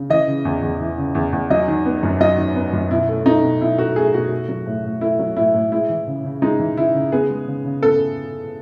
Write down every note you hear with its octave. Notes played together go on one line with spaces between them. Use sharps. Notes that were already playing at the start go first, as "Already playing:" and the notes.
Already playing: C#3
E3 D#5
C#3
E2
E2
E3
C#3
E2
E2
F#3 D#5
D#3
B3
F#2
F#3 D#5
D#3
B3
F#2
B2 E4
A3
A3 D#4
B2
B2 E4
A3 F#4
A3 G#4
B2 F#4
A3
F#3
A2
A2
A3 E4
F#3
A2 E4
A2
G#3 E4
E3
C#3
C#3
G#3 D#4
E3
C#3 E4
C#3
B3 G#4
G#3
C#3
C#3
B3 A4